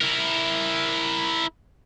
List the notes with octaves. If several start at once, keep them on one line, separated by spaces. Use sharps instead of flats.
E4 A#4